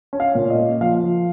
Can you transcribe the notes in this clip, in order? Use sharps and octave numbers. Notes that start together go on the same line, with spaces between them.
C#4
F5
A#2
D#5
A#3
F3 F5
F3